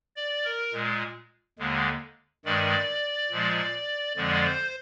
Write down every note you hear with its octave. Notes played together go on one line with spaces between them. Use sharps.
D5
A#4
A#2 G#3
D#2 D3 G#3
G2 D#3 G#3 D5
A#2 F3 G#3
F2 D3 F3 G#3 D5
C5